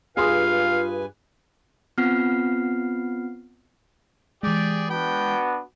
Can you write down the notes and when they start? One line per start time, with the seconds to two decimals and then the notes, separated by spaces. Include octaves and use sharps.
0.17 G2 F4 G#4 B4 F5 G#5 C6 D#6
1.98 B3 C4 F4 F#5 F6 C7
4.43 E3 G#3 G4 G#4 D5
4.90 B3 D4 F#4 G5 B5